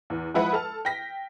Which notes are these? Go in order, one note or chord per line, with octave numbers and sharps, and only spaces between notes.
E2
F3 G#3 E4 B4 F#5 B5
A4 A5 F6
G5 A#6 B6